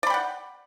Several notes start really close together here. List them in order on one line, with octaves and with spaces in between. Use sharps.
D5 B5 G5 F#5